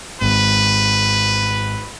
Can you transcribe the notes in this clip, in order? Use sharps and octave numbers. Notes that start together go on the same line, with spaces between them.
G#1 B4